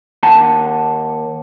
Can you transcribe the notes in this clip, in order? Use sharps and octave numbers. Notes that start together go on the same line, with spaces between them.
D#2 F#5 A5